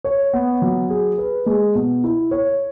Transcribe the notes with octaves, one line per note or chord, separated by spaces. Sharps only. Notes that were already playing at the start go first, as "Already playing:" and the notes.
C#5
B3
F#3
G#4
B4
G#3
B2
E4
C#5